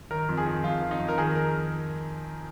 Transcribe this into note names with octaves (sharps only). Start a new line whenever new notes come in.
D#3 A#4
F2
G#4
D#3
F2 F4
D#3
D#4
F2
A#4
D#3 G#4
A#4